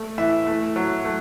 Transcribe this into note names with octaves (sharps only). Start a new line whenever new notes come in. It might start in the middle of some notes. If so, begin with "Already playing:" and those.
Already playing: A3
E3 E5
A3
F#3
A3